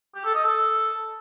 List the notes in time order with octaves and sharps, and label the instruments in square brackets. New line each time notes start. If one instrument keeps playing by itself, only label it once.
[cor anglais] G4
A4
D#5
A4